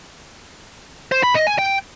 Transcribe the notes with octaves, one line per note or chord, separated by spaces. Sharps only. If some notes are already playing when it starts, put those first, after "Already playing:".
C5
B5
D#5
G#5
G5